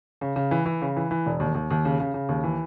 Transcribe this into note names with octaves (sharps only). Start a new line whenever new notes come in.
C#3
C#3
E3
E3
C#3
E3
E3
E1
D#2
D#2
D#2
C#3
C#3
C#3
D#2
E3